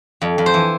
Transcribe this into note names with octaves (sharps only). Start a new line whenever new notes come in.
F2
F2
C5
E3